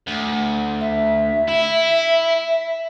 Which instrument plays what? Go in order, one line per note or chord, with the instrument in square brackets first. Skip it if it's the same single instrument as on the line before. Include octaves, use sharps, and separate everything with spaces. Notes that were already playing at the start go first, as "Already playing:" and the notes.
[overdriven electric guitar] D2
[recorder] E5
[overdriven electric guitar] E4